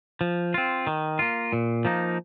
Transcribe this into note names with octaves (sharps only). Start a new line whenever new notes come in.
F3
C4 F4
D#3
A#3 F4
A#2
F3 A#3 D#4